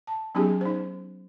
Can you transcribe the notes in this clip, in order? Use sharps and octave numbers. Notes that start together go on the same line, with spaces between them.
A5
F#3 B3 C#4 D#4 G4 G#4
D#4 C5